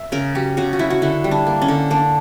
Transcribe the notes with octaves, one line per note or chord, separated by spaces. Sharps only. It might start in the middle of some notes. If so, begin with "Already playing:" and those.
Already playing: E5
C#3 A#4
F#3 G4
C#3 F#4
F#4
F#3 E4
F#4
D3 E4
G3
D4
A#3
C#4
D3
A#3 D4